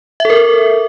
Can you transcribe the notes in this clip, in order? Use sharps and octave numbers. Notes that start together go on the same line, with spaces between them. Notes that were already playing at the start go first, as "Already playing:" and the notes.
A4 A#4 E5